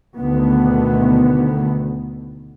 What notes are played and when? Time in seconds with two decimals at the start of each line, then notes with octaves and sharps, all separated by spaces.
0.17 D2 B2 D3 D#3 B3